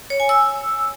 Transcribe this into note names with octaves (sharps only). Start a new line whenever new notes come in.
C#5
G#5
E6